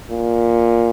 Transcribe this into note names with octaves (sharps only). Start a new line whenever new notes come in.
A#2